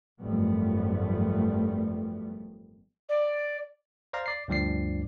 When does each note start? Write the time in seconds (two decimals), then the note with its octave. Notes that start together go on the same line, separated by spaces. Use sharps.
0.20 G#1 F#2 F3 G3 A3 B3
3.09 D5
4.13 C5 D5 F5 A#5
4.26 D5 C7
4.48 D2 G2 F3 D5 C7